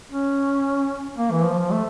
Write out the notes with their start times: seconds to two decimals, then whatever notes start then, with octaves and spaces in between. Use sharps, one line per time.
0.11 C#4
1.17 A#3
1.31 E3
1.45 F3
1.58 F3
1.71 A3